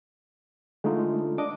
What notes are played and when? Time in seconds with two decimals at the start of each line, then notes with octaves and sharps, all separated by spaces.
0.84 D3 G#3 A3 D#4 F4
1.38 D4 D#5 D6